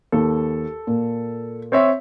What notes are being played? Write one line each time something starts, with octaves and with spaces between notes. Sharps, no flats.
D#2 A4
A#2
C4 C#5 E5